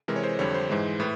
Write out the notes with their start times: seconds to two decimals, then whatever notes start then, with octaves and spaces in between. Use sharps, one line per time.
0.08 C3 E3 G#3 A#4
0.16 C#5
0.24 C5
0.39 F2 D3 G3 C#5
0.54 C5
0.69 G#2 E3 G#3
1.00 A2 B4